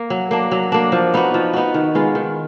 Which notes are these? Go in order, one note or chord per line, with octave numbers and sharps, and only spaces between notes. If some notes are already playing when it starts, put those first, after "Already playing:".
Already playing: A#3
F#3
A#3 D4
F#3
A#3 D4
F3
B3 D#4 F#4
F3
B3 D#4 F#4
D#3
G#3 B3 F4
D#3